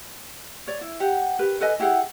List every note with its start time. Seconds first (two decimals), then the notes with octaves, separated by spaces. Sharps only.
0.67 C#5 D5
0.81 E4
1.00 G4 F#5
1.39 G4 A#4 B4
1.61 A4 B4 D#5 G#5
1.80 E4 G4 G#4 F#5